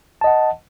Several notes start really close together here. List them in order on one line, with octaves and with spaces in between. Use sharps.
A5 D#5 F#5